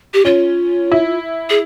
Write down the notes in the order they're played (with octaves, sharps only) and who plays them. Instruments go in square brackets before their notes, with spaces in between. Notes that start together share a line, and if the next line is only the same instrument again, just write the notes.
[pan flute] G4
[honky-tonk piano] C#4 [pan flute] F4
[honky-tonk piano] E4
[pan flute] G#4